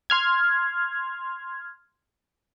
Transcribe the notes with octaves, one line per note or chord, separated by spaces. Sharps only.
C6 F6 G#6